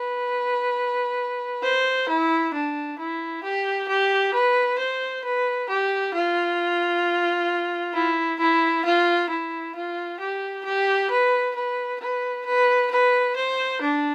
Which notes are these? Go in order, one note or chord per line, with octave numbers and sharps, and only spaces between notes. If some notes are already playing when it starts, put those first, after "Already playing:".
Already playing: B4
C5
E4
D4
E4
G4
G4
B4
C5
B4
G4
F4
E4
E4
F4
E4
F4
G4
G4
B4
B4
B4
B4
B4
C5
D4